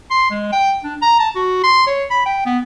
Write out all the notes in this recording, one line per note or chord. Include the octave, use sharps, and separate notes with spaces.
C6
G#3
G5
D4
A#5
A5
F#4
C6
C#5
B5
G5
B3